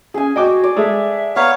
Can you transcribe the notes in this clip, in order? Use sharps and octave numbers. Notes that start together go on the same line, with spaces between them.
C#4 G#4 G#5
F#4 D#5 G5 D6
D5
G#3 G#4 A4 E5
B3 C#5 F5 A#5